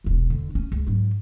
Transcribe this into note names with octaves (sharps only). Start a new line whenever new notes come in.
E1 C2
D3
C#4
C#2
G#2 F#3